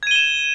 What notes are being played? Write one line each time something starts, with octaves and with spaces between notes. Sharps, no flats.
G#6 D#7 E7 G7